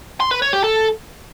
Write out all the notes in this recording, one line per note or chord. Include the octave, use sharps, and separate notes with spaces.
C6
B4
C#5
G4
A4